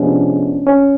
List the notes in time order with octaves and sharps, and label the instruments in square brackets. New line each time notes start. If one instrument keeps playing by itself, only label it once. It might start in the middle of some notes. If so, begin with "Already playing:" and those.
Already playing: [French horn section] C3 F3 G#3 B3 D4 [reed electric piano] C#4
[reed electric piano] C#4